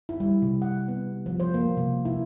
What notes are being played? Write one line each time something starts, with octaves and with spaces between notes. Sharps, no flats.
E4
G3
C3
F#5
B3
F3
C5
A#3
C3
E4